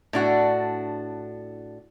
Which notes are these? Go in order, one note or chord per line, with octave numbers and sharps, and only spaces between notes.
A2 D4 F#4